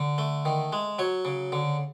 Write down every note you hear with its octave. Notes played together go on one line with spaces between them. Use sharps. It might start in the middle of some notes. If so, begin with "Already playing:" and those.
Already playing: D3
A3
D#3
G#3
F#3 C#5
C#3
D3